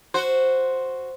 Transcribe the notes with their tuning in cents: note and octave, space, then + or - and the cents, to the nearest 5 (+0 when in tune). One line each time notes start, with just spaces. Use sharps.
F#4 +0 C5 +0